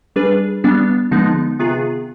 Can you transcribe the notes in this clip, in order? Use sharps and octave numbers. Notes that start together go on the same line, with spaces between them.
G3 D4 G#4 B4
G3 B3 D4
D3 F3 G#3 B3 D#4
C3 D#3 B3 F4 G#4